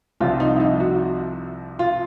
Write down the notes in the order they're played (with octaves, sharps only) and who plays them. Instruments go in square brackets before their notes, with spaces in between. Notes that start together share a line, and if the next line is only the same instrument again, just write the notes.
[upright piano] C2 C3 F3 F4
D#4
E4
D#4
F#4
F4